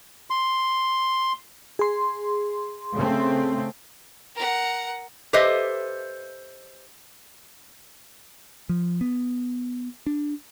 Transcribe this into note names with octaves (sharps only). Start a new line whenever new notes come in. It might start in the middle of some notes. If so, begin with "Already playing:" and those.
C6
G#4 C6
C#3 A3 C4
A#4 F#5
G4 A4 B4 C5 D#5 E5
F3
B3
D4